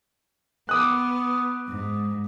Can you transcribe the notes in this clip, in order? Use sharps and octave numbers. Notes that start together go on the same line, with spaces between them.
B3 D6 D#6 F#6
G#2